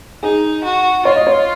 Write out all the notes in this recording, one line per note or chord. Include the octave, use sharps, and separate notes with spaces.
D#4 G#4
F#4
F4 C#5
D#5
C#5